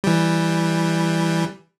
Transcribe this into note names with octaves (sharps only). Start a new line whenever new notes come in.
E3 G3